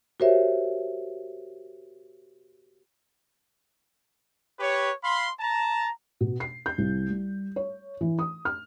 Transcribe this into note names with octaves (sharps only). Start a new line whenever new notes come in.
F#4 G4 A#4 C5 C#5 E5
G4 B4 C#5
F5 B5 C6
A5 A#5
B2
C7
G6
C2
G3
C#5
E3
D#6
F6